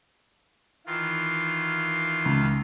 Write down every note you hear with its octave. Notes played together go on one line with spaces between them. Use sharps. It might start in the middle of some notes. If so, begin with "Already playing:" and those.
D#3 E3 F4
C#2